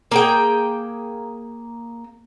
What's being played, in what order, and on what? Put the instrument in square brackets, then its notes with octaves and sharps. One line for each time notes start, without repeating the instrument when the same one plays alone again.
[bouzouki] A#3 G#4 G5